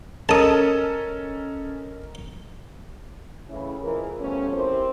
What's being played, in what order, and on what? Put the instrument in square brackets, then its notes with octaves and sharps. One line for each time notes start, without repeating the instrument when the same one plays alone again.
[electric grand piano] C#4 A4 [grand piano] A#4 D#5 A#5 [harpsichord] A5 D#6
[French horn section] A2 C#3 E3 C#4 E4
F2 E3 F4 G#4 A#4
F3 G3 A3 B3 C#4
C4 E4 G4 A#4 C5